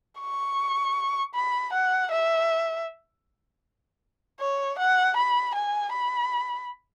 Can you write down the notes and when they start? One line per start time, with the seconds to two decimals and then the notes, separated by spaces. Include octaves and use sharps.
0.20 C#6
1.35 B5
1.73 F#5
2.11 E5
4.41 C#5
4.79 F#5
5.17 B5
5.55 G#5
5.93 B5